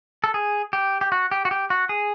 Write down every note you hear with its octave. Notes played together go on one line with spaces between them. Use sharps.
A4
G#4
G4
G4
F#4
G4
F#4
G4
F#4
G#4